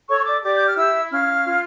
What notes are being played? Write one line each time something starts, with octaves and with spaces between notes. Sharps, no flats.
A4 C#5 C#6
C#6
D5 D6
G4 D5 D6
G6
F6
E4 E5 E6
C#4 F5 F6
F4